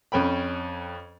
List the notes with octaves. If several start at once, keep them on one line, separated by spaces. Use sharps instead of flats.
F2 C#4 G5 B5